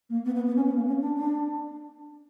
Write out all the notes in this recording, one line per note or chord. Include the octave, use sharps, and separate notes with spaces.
A#3
B3
B3
B3
C#4
B3
A#3
C#4
D4
D4